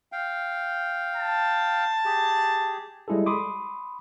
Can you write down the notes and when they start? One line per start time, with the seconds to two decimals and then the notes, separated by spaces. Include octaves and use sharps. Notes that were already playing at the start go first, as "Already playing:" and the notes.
0.12 F5 G5
1.17 A5
2.05 G4 G#4
3.08 G3 G#3 E4 G#4 A4
3.26 B5 C6 D6 D#6